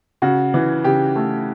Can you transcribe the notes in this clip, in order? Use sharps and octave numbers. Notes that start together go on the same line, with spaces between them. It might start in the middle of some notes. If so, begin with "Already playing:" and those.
C#3 F#4
E3
C#3 G4
A3